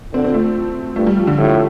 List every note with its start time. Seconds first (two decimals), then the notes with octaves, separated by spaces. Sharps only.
0.14 D3 C4
0.24 C4
0.34 A3
0.96 G2 A3
1.07 G3
1.17 F3
1.27 D3
1.38 A2 D3